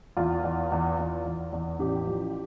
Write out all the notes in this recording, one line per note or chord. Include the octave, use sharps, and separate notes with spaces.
E2 F4
E2
E2
E2
E2
E2
A1 G4
F3